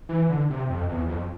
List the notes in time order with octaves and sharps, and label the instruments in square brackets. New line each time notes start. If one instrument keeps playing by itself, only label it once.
[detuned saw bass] E3
D3
C3
F2
E2
F2